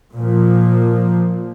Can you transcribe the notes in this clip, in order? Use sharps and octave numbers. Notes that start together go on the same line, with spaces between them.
A#2 F3 A#3